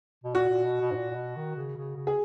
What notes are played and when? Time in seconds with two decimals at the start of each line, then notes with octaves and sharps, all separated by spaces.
0.24 B2
0.35 A#2 F#4
0.49 A#2
0.65 B2
0.81 B2
0.92 G#2
0.95 A#2
1.11 A#2
1.15 B2
1.36 D#3
1.56 C#3
1.77 C#3
1.96 C#3
2.07 G#4